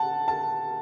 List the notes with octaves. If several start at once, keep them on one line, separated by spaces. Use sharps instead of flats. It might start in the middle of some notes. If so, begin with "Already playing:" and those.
Already playing: F#5 A5
A5